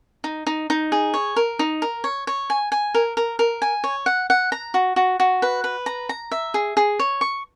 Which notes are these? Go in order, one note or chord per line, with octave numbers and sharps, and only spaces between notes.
D#4
D#4
D#4
G#4
C#5
A#4
D#4
A#4
C#5
C#5
G#5
G#5
A#4
A#4
A#4
G#5
C#5
F#5
F#5
A#5
F#4
F#4
F#4
B4
B4
A#5
A#5
E5
G#4
G#4
C#5
C#6